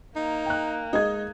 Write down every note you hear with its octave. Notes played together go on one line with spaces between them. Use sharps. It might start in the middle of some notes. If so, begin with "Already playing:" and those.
A#3 D#4
G5 F#6
G#3 D#4 G#6